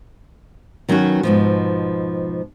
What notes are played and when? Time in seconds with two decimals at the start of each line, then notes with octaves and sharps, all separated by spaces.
0.89 D#3 F#3 B3 C#4 F#4
1.23 G#2 B2 F3